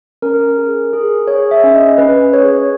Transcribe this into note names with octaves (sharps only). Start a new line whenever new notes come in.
C#4 A#4
G#4
G#4
G#4 C#5
E5
C#4
D#5
C#4 B4
G#4 C#5